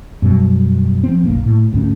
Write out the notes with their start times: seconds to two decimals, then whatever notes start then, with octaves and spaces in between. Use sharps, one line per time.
0.22 F#2 B2 G3
1.04 F3 C4
1.23 F#1 B1 B2 A#3
1.46 A2
1.73 D2 G#2 C#4